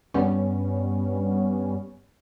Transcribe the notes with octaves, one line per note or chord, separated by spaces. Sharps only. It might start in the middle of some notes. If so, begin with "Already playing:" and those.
G2 G3 B3 C#4